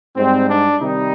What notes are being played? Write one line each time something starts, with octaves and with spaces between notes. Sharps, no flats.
G#2 G3 C4
D4
C3 D#3 G3 D#4